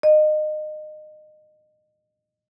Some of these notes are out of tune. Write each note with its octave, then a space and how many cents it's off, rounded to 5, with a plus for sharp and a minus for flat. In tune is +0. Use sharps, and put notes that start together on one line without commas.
D#5 -25